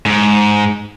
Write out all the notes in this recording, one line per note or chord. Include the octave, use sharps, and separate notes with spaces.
G#2